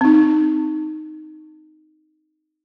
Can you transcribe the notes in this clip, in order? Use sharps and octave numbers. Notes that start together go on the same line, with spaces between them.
C4 D#4